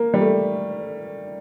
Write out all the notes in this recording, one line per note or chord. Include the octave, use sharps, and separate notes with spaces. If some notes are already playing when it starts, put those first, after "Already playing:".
Already playing: A#3
G3
A3